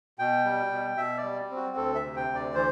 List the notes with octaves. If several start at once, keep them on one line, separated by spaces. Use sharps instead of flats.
B2 G5
G3
B2
B2 E5
D5
G3
C4
F#4
D2 A4
E5
C3
G5
D2
D5
E3 C5